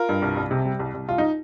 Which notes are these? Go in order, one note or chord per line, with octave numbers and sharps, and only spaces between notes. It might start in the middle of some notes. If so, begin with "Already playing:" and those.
Already playing: F4 A#4
G2
C2
C2
C3
G3
C2
C2
C2 F4
D#4